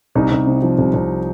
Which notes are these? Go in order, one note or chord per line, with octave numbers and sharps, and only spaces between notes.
C2 D#4
C2
C3
F3
C2
C2